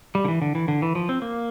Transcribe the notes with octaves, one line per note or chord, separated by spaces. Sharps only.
G3
D3
E3
D3
E3
D3
E3
F3
C4
A#3